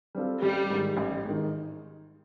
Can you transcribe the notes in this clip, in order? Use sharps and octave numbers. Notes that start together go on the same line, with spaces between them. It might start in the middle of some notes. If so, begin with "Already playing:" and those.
G3 C4 F4 A4
A1 G3
G#2 D#3
A1
G#2 D#3